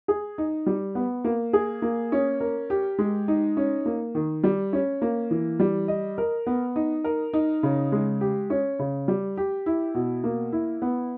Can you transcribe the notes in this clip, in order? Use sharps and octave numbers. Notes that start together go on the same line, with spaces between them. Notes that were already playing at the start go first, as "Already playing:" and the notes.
G#4
D#4
G3
B3
A#3
G#4
A#3
C#4
A#4
G4
G#3
D#4
C#4
A#3
D#3
G3
C#4
A#3
E3
G3
D#5
A#4
B3
D#4
A#4
D#4
C#3
G#3
G4
C#4
C#3
G3
G4
E4
B2
A#3
E4
B3